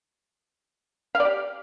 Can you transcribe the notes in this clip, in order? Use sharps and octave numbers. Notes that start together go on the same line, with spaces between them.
F5
D5
G4